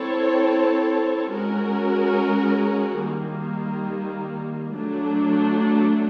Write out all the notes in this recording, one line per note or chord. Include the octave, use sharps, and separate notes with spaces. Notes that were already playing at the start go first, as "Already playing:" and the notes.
Already playing: C4 E4 A4 C#5
G#3 C#4 F#4 A#4
D#3 G3 A#3
F#3 A3 D4